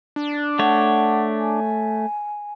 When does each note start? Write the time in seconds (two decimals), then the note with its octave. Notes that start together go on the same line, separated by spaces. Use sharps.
0.16 D4
0.59 A3 C#5 F#5
1.39 G#5